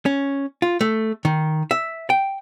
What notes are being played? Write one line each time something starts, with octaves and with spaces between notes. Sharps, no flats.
C#4
F4
A3
D#3
E5
G5